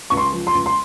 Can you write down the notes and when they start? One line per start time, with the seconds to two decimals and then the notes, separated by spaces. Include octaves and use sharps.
0.10 C#2 C#6
0.17 C6
0.32 F3
0.47 C6
0.54 C#2
0.66 C6